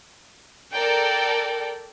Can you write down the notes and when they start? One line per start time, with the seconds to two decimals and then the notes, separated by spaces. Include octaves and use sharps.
0.74 A4 A#4 D5 G5